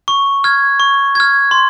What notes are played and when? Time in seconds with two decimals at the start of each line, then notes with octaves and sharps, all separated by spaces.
0.08 C#6
0.44 F6 G#6
0.80 C#6
1.15 F6 G#6
1.51 C6